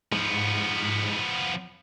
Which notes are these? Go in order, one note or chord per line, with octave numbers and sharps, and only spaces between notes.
G#2 F3 B3